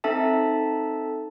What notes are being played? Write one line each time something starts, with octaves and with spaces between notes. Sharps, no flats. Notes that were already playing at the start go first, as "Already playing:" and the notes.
C4 D#4 A4 E5 A5